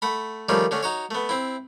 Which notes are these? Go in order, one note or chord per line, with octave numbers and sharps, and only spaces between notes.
A3 F#5 B5
D#3 F3 G3 A3 C#4
D3 A3 C#4
D#4 F#4 C#5
A3 B3
C4 E4